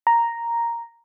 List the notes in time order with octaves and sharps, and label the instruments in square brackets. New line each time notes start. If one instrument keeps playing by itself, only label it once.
[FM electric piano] A#5